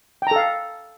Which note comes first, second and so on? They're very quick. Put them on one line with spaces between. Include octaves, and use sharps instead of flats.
G5 A#5 A4 F5